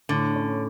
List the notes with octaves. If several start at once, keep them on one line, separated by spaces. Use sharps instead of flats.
A2 D3
C#4